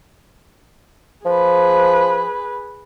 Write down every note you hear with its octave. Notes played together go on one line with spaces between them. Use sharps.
F3 G#4 B4